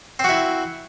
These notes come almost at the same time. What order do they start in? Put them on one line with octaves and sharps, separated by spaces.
C4 F#4 E4